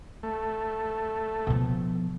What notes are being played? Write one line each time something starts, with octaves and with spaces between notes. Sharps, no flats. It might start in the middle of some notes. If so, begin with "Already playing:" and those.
A3
B2 F3